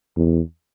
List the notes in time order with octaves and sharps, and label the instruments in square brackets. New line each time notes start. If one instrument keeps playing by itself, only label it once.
[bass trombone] E2